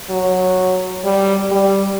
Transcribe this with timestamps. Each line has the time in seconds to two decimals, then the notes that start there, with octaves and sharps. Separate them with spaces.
0.10 F#3
1.05 G3
1.52 G3